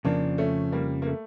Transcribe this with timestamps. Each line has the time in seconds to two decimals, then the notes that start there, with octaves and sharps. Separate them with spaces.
0.05 F2 C#3 F3 A#3 D4
0.38 A3 C#4
0.72 G3 A#3
1.02 A#3
1.06 A3